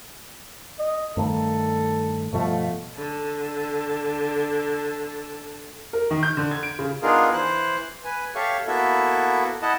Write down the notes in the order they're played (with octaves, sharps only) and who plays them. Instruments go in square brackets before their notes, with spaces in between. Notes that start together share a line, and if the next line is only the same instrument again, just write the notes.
[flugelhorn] D#5
[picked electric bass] G2 D#3 A3 [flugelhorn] A4
[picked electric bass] G2 B2 F3 [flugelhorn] A3
[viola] D3 A5
[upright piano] A#4
D#3
G6
D3
G#6
D7
C#3
[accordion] B3 D4 D#4 F4 G#4 A#4
E3 E4 C5 F#6
B4 G#5
G4 A4 C#5 E5 F5 C#6
A#3 B3 E4 F#4 A4 E5
E4 D#5 F#5 A5